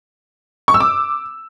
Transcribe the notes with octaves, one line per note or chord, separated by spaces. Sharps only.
C#6
E6
D6